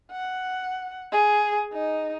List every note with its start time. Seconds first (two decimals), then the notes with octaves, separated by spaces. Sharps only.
0.12 F#5
1.12 G#4
1.73 D#4